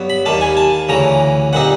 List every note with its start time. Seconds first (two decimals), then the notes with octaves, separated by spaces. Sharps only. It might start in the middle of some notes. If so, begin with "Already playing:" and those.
Already playing: G2 F#3 B3
0.10 B5
0.26 D#2 D#3 G3 A5
0.41 G#5
0.57 A5
0.89 D2 C#3 E3 A#5
1.53 A#2 G3 C4 D#4 F#5